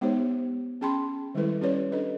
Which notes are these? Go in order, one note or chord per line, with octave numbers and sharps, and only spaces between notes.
G#3 B3 D#4 G4 C5 C#5
C#4 G#4 G5 A5 B5 C6
D#3 G3 G#3 E4 A4 B4
C#4 G4 B4 C#5 D5
D4 A4 B4 D#5